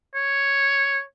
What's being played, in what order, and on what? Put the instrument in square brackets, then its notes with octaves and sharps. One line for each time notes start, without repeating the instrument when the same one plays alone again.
[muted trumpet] C#5